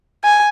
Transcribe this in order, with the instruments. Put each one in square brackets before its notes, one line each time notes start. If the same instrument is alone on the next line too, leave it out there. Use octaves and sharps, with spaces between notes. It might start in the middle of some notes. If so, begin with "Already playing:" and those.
[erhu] G#5